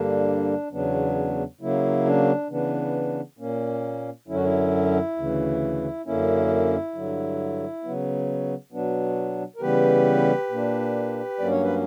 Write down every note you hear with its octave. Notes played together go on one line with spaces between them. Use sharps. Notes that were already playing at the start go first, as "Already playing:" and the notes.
Already playing: G2 D3 G3 A#3 D4
E2 C#3 F#3 B3 D4
C#3 F#3 A#3 E4
D4
C#3 E3 B3 D4
A#2 A#3 C#4
F#2 D3 F#3 C#4 E4
F#4
E4
D2 C#3 E3
F#2 D3 A#3 C#4 E4
G2 D3 F#3
C#3 F#3 B3
B2 F#3 B3 D4
A#4
C#3 E3 G3 B3 G4 B4
A#2 A#3 D4
G2 F#3 A#3 C#4 D5
C#5
B4